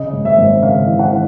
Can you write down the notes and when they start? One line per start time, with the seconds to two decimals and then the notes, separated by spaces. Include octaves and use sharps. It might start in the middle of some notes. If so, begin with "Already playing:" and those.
Already playing: C#3 D#5
0.13 G#1
0.25 E5
0.38 G#1
0.62 C#3 F5
0.87 E3
0.99 F#5
1.12 E3